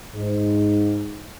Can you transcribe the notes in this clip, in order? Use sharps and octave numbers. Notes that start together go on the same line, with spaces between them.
G#2